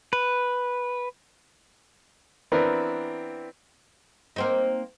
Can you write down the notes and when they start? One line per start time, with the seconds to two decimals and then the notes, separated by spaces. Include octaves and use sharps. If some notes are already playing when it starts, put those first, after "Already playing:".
0.13 B4
2.52 E3 B3 C4 D4 A#4 B4
4.36 A#3 C4 D#4